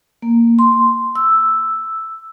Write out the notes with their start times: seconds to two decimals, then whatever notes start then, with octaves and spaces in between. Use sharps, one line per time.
0.22 A#3
0.59 C6
1.15 E6